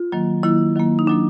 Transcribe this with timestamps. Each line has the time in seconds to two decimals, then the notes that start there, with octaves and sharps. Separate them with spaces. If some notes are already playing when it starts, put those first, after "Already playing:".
Already playing: F4
0.12 D#3 F#3 A#3
0.43 D#3 F#3 A#3 E4
0.76 D#3 F#3 A#3
0.99 D#4
1.07 D#3 F#3 A#3 D4